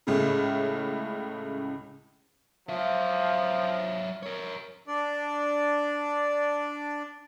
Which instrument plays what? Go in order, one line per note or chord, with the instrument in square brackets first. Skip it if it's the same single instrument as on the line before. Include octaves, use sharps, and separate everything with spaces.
[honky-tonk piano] C#2 A2 C#3
[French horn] F3 [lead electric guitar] F#3 E5
[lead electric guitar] A#4 C#5
[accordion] D4 D5